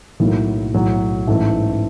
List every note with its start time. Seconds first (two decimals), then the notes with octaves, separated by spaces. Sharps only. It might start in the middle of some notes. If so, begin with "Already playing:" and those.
0.20 B1 A2 F#3 A#3 D#4
0.74 B1 A2 F#3
1.27 A1 G#2 E3 A3